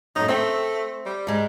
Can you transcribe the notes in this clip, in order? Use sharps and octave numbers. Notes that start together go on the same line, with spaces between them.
F#2 A2 D#4
A3 C4 G5
G3
G#2 G#3